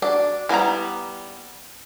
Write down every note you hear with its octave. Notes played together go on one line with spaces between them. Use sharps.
F#3 D4 D5
E3 G3 B3 G#5 A#5